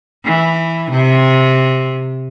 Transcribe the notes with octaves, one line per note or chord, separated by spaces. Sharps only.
E3
C3